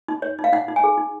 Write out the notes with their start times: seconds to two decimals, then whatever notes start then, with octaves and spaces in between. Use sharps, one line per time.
0.08 D#4
0.22 C#5
0.39 D#4
0.44 F5
0.53 D#4 F#5
0.68 D#4
0.76 G#5
0.84 G#4
0.98 D#4